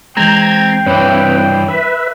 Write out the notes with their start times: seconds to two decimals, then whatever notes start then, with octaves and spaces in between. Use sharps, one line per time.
0.17 E3 G#3 C4 G5 A#5 G#6
0.86 G2 E3 C4 B4 C#5
1.68 B4 E5